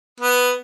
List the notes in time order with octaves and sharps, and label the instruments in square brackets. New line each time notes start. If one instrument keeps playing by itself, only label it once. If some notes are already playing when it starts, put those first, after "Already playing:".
[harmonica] B3